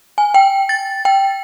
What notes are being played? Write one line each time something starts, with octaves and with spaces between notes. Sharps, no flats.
G#5
G5
A6
G5